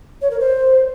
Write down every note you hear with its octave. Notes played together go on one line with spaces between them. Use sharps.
C#5
A#4
C5